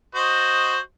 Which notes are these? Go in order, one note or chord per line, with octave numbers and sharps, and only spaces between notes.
F#4 C5 D#5